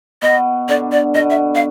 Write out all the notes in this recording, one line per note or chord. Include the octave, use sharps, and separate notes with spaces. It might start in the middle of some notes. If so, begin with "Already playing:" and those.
B2 B3 D#5
D3 D4 D5
D5
B2 B3 D#5
E5
F5